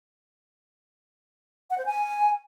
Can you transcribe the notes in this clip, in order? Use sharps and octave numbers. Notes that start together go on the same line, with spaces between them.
F#5
C5
G#5